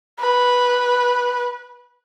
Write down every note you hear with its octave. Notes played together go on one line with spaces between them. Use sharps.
B4